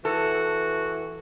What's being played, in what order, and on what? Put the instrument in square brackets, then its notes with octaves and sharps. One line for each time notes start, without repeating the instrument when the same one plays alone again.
[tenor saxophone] E3 [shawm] F#4 [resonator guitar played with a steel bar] A4